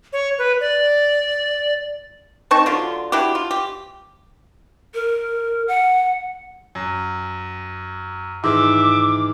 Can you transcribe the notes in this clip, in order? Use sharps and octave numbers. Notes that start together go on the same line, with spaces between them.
C#5
B4
D5
C4 D#4 A5 C#6
D3 F#3 F4
D4 E4 F#4 G4
F4
G4
A#4
F#5
F#2
G#2 D#3 E3 E5 D6